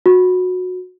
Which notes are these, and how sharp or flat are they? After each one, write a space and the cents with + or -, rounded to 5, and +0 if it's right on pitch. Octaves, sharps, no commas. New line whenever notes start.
F#4 -20